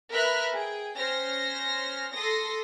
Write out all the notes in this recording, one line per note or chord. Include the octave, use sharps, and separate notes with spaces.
A#4 B4 E5 B5 F6 F#6
G#4 G5
C#4 C5 F6 A#6
A4 C6 D#6 A#6